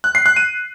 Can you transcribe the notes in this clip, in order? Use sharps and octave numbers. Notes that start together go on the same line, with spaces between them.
F#6
C7
F#6
D#7